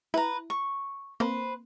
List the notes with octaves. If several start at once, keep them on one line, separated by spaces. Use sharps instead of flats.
E4 B4 A#5
C#6
A#3 C4 B4 C5